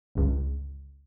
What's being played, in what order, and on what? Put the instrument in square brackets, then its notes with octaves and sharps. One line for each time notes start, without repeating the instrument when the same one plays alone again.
[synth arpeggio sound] G1 C#2